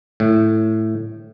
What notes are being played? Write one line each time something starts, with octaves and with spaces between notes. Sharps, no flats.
A2